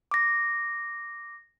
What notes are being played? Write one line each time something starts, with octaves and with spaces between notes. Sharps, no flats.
D6 A#6